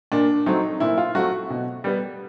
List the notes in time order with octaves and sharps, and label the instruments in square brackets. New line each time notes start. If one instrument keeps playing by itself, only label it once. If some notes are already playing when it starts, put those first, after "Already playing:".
[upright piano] A#2 D4
F#3 A3 C4 D#4
A#2 E4
F4
F#3 A3 C4 F#4
B2
G3 B3